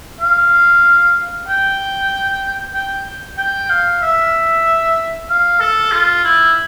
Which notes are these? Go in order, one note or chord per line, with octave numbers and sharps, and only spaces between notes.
F5
G5
G5
G5
F5
E5
F5
A4
F4
E4